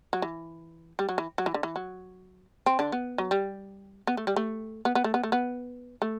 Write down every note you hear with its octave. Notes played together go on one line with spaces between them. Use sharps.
F#3
E3
G3
F#3
E3
F#3
E3
D3
E3
F#3
C4
D3 D4
B3
F#3
G3
B3
A3
G3
A3
B3
B3
A3
B3
A3
B3
A3